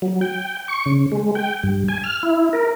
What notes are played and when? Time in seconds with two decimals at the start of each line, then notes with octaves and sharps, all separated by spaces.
0.02 F#3
0.21 G5
0.68 C#6
0.86 C#3
1.12 G#3
1.35 G5
1.63 G2
1.88 G#5
2.04 F6
2.23 E4
2.53 A#4